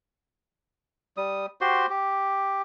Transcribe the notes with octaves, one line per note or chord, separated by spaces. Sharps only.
G3 D#6
F#4 G4 C5 C6
G4